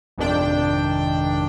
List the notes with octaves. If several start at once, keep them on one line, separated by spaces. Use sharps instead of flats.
G#1 F2 C3 D#3 D4 G5